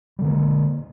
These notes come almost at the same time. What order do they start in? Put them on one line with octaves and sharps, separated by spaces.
G3 D3 G#3 A#3